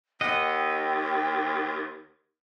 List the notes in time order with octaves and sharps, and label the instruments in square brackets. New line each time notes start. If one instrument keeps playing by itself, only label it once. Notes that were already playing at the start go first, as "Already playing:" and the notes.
[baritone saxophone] D#2 [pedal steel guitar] D#5 F#5 [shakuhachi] G5